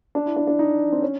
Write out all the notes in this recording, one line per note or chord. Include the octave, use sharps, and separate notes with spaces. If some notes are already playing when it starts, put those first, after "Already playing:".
D4
E4
D4
D4
D#4
C4
C#4